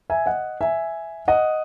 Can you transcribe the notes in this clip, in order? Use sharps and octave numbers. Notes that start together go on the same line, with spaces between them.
E5 G#5
D#5 F#5
E5 G#5
D#5 F#5